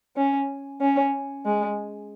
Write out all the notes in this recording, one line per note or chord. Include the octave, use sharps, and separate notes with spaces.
C#4
C#4
G#3